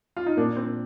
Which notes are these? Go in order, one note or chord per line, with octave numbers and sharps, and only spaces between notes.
F4
D#4
A#2 A#3 D4
C4